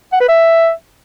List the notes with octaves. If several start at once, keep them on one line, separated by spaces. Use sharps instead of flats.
F#5
B4
E5